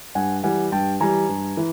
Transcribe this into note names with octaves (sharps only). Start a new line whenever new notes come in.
G2 F#5 G#5
E3 G3 F#5 G#5
G2 G5 A5
E3 G3 G#5 A#5
G2
E3